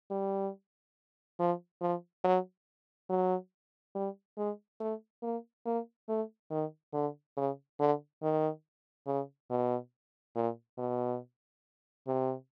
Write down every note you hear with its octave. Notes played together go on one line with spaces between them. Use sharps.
G3
F3
F3
F#3
F#3
G3
G#3
A3
A#3
A#3
A3
D#3
D3
C#3
D3
D#3
C#3
B2
A#2
B2
C3